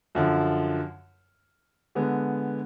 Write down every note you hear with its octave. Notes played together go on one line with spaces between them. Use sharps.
F#2 D3 F3
D3 G#3 B3